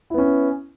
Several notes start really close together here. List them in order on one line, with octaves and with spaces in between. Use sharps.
E4 B3 C#4